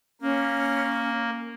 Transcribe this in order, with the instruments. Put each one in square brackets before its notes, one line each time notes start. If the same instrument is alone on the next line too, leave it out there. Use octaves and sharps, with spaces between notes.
[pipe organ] A#3 [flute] C#4